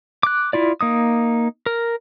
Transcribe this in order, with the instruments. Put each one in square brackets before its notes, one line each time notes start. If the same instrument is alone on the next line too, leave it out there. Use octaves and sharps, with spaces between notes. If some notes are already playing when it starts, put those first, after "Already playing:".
[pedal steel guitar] D6 F#6
E4 F4 D5
A#3 D#4 D#6
A#4